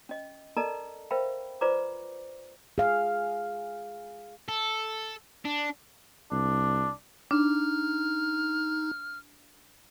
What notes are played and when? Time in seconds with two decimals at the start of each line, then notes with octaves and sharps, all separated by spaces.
0.09 C#4 D#5
0.57 A4 A#4 D5 D#5 A5 A#5
1.11 A#4 C5 E5 F5 G5 B5
1.61 F4 B4 C5 D5 A#5 D6
2.78 G#4 F5
4.49 A4
5.45 D4
6.32 C2 D4
7.31 D4 D#4 F6